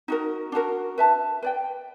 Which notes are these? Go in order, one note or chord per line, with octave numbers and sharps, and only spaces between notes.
D#4 F#4 A#4
D4 F#4 A#4
B4 E5 A5
B4 D5 G5